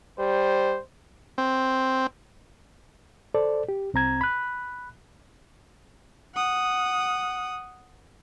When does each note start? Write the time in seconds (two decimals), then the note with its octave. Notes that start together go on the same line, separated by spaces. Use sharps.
0.19 G3 C5
1.38 C4
3.34 A4 C5 D5
3.69 G4
3.94 C2 C4 A#5 G#6
4.21 B5 F#6
6.35 F#5 D#6